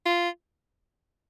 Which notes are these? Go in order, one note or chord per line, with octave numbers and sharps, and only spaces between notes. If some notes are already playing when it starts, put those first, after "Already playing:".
F4